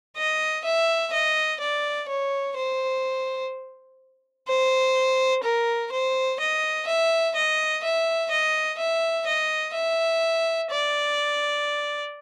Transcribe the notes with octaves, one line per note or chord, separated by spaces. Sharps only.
D#5
E5
D#5
D5
C#5
C5
C5
A#4
C5
D#5
E5
D#5
E5
D#5
E5
D#5
E5
D5